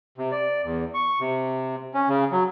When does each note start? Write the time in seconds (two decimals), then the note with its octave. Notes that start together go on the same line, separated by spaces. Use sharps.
0.18 C3
0.32 D5
0.64 E2
0.94 C#6
1.20 C3
1.94 C#4
2.09 C#3
2.32 F#3